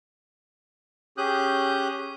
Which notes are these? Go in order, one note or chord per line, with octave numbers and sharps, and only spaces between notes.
C#4 G4 G#4 D#6 F#6 G6